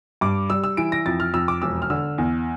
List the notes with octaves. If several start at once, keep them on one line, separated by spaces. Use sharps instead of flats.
G2 D6
G3 E6
E6
E3 D7
A#6
F2 A6
F6
F2 E6
D6
E1 E6
F6
D3 E6
E2